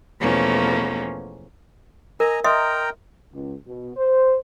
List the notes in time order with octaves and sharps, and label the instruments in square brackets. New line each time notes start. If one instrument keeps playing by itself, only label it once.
[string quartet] E2 B2 F3 A3 A#3 C#4
[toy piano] A#4 [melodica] D#5 G#5 A#5
[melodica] A#4 G5 A#5 [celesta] D#5 C6 D#6 [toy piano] E5
[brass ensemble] C#2
B2
C5